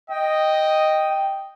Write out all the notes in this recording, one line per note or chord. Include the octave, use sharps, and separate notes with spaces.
D#5 G5